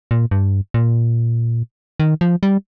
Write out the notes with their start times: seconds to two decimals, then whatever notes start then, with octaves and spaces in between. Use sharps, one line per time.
0.11 A#2
0.31 G2
0.74 A#2
2.00 D#3
2.21 F3
2.43 G3